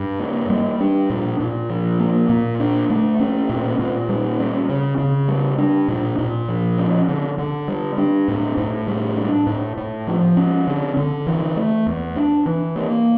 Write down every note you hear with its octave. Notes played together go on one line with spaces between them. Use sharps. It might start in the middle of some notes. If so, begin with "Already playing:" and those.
Already playing: G2
A#3
G3
D4
A#2
A#2
F3
A#3
A#2
D4
A3
C#4
A#2
A#2
G3
C#4
C#3
C#3
G3
D4
A#2
A#2
F3
C#4
D3
D3
G3
D4
A2
A2
G3
D4
A2
A2
F3
C#4
D3
D3
E3
A3
E2
D4
E3
A#3